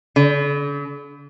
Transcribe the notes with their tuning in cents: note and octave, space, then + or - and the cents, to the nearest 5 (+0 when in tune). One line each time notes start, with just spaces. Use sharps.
D3 -45